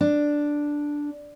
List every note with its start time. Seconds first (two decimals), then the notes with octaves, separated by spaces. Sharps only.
0.01 D4